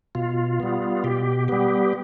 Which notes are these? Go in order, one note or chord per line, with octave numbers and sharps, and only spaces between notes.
B2 F4
G3 B3
B2 G4
G3 B3 G4